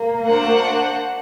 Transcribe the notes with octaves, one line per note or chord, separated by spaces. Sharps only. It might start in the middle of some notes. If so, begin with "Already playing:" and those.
Already playing: A#3
D4 F#4 C5 F#5